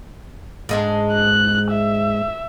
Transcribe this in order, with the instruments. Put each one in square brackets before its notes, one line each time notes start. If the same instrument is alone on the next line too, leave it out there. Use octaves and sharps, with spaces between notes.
[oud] G#2 G#3 D4
[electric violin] F#6
E5